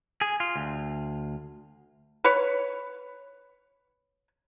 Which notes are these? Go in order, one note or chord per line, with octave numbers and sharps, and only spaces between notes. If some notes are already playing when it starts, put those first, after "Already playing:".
G#4
F4
D2
B4 C#5